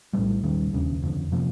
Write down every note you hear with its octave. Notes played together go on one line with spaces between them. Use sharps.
A#1 A2 E3 G3
D#2 D#3 G3
E1 D#2 C#3
F1 F2 D3 F3
C3 F3 A#3